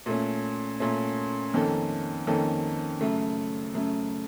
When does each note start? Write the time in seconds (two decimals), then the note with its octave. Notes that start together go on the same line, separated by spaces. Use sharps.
0.06 A#2 A3 C#4
0.80 A#2 A3 C#4
1.54 F2 D#3 A#3 C#4 A4
2.27 F2 D#3 A#3 C#4 A4
3.01 F#2 C#3 A3
3.74 F#2 C#3 A3